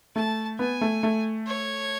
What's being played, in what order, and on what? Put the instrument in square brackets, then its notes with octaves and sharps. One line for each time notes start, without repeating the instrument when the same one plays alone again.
[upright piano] A3 [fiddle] A5
[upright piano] B3 [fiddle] G#5
[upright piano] A3
A3
[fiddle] C#5